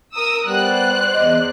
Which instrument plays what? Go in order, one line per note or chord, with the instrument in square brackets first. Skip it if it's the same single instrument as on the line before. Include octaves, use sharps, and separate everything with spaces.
[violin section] A#4 D#6 E6
[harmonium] G3 B3 [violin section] C5 D5 F#6
[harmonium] E2 D#5